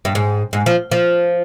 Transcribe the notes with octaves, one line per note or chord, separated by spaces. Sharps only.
G2
G#2
G#2
F3
F3